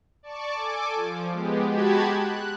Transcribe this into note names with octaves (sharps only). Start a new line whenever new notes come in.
D5 A5 C#6 D6
A4 G#5 D6
F3
G#3 B3 G4
G#3 F#4 G4 A5 B5 G#6
F#6